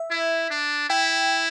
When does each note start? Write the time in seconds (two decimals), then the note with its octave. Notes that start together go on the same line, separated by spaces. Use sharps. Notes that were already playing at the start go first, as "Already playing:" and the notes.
Already playing: E5
0.11 E4
0.50 D4
0.90 E4 G5